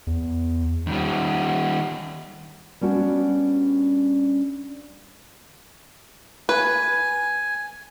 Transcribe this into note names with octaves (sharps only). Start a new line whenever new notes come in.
E2
D#3 G3
G3 B3 C#4 D4 F#4
B4 G#5